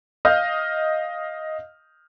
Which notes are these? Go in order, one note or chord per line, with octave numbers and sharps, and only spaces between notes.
D#5 F5 F6 G6